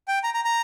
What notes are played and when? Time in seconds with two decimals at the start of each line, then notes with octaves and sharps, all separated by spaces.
0.08 G5
0.23 A#5
0.34 A#5
0.44 A#5